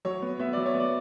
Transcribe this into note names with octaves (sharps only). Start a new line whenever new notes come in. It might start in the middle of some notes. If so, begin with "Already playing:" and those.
F#3 C#5
B3
B3 E5
F#3 D5
C#5
B3
D5